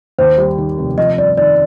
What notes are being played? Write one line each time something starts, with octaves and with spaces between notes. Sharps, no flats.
D#2 C5
G3
D#3
F1
F2 D#5
G1 D5
D#3 D5